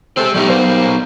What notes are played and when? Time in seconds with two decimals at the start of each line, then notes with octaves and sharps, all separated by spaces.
0.17 G#3 C4 G4 A4 C5
0.34 F#3 G3 A3 B3 D#4
0.48 G3 A#3 C5